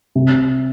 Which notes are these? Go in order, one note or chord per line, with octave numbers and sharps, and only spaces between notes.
C3